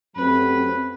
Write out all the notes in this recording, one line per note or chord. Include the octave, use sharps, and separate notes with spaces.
F#2 F#3 A3 C4 G4 B4